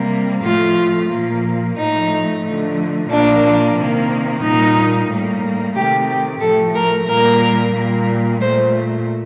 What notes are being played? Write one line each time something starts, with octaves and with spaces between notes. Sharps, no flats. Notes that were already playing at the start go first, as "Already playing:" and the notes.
Already playing: C3 G3 A#3
A2 F3 A3 F4
A#2 F3 A#3
A2 F3 A3 D#4
D3 F3 A3
A#2 F3 A#3 D4
C3 D#3 A#3
A#2 G3 A#3 D#4
A2 G3 A#3
C3 D#3 A3 G4
G4
A2 F3 A3 A4
A#4
A#2 G3 A#3 A#4
A#2 G3 A#3
A#2 A3 C5